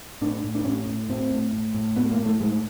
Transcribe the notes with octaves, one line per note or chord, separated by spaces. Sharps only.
A2 D4
A2
D4
A2 C#4
A2
A2 C4
A2
A2
A2
A2 B3
A#3
A2
A3
A2 G#3